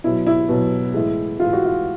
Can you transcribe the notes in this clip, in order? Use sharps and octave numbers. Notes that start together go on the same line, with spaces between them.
B2 F#3 E4
E4
B2 F#3
A2 E3 G#3
A2 E3 G#3 F4
F#4
F4